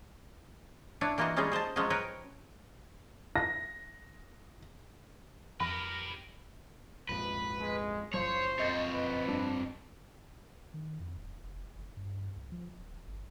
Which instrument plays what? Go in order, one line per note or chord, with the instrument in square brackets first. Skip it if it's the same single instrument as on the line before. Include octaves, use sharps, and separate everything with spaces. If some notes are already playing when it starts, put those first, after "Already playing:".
[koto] D4 E4 B4 C#5
E3 A#3 F4 F#4 D#5
G3 G#3 C#4 D#4 F4 G#4
G#4 C5 D#5 A5
F3 F#3 G#3 C#4 F4 D#5
A#4 B4 C#5 G5
[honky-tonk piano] A#6
[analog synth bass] F2 [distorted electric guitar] G4 B4 [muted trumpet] A#4 [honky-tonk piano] B5
[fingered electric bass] A#1 F2 G#2 [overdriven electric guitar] B4
[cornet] G#3
[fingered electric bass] F#1 [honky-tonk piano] F3 [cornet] C5 [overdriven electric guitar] C#5
[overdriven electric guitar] F2 C#5 [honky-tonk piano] D#5 G6 A6
[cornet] B4
[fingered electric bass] G2 [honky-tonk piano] D4
[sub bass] D#3
F2
D#1
F1
F#1
G2
C2
F3
D1
G1